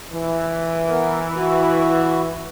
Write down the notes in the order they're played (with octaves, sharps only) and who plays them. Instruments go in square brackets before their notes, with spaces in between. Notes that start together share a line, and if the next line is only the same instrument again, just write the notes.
[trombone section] E3
[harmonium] B3 A#4
E4 F#4